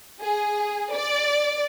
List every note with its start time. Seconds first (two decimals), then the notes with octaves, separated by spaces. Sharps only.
0.21 G#4
0.92 D5